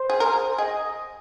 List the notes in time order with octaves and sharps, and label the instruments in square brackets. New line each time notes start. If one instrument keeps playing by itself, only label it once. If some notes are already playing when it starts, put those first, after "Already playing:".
Already playing: [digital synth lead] C5
[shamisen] G#4
A#4
G#4
[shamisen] G#4 [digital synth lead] D#5